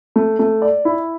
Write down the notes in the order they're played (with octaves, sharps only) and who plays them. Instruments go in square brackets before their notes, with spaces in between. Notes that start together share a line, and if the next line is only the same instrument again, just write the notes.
[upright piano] A3
A3
D5
E4